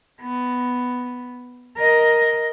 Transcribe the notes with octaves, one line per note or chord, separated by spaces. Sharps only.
B3
A#4 D#5